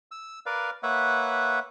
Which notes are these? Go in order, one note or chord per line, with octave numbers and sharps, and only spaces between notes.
E6
A#4 B4 D5 F5
A#3 B4 C#5 E5 F#5